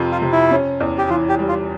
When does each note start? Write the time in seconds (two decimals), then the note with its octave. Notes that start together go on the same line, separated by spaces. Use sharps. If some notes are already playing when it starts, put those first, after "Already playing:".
Already playing: F2 C3
0.12 F4
0.22 C3
0.32 E4
0.51 C#4
0.80 E2
0.98 G4
1.09 E3 F4
1.29 G4
1.39 G3
1.49 F4